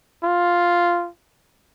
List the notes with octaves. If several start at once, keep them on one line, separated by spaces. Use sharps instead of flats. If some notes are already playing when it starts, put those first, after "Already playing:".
F4